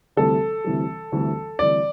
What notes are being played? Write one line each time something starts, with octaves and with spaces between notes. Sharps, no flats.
D2 C3 E3 G3 A4
D2 C3 E3 G3
D2 C3 E3 G3
D2 C3 E3 G3 D5